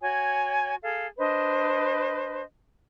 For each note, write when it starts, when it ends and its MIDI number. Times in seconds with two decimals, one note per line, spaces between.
0.01 0.74 66
0.01 0.74 73
0.01 0.74 80
0.82 1.06 68
0.82 1.06 69
0.82 1.06 77
1.18 2.42 62
1.18 2.42 71
1.18 2.42 72
1.18 2.42 75